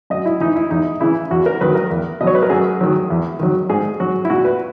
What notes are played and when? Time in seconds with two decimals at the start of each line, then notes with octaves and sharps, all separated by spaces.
0.10 F#2 D#5
0.25 E4
0.40 E3 D#4
0.56 E4
0.70 E2 D#4
1.01 C#3 E3 E4
1.31 E2 F#4
1.46 A#4
1.61 D#3 F#3 B4
1.75 A#4
1.90 E2
2.20 B2 D#5
2.24 F#3 C#5
2.35 B4
2.43 A#4
2.50 F#2 G#4
2.81 D#3 F#3
3.10 E2
3.40 D#3 F#3
3.69 G#2 G#4
4.00 F#3 F#4
4.25 E4
4.30 A#2 F#4
4.45 B4